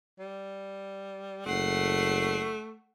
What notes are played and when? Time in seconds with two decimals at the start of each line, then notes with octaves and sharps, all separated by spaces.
0.19 G3
1.46 F#1 A3 F#5 C7